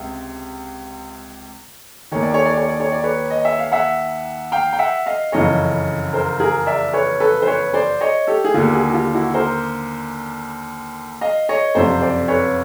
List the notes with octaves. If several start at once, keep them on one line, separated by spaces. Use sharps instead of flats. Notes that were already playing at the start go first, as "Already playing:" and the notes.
Already playing: C#2 C3
D#2 D#3 C#5
D5
C#5
D5
C#5
D5
C#5
D5
B4 C#5
D#5
E5
F5
E5 F#5
F5 G5
G5
E5 F#5
D#5 F5
F#1 F2 C#3 E3 C#5 D#5
A#4 C5
G#4 A#4
D5 E5
B4 C#5
A4 B4
C5
B4 C#5
C5 D5
C#5 D#5
G4 A4
G#4
D#2 D3 F4 G4
F#4 G#4
F#4
F4 G4
E4 F#4
A#4 C5
D#5 F5
C#5 D#5
F#1 F2 C3 C5 D5
C5 D5
B4 C#5